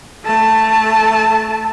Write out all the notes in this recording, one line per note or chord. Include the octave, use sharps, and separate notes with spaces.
A3 A5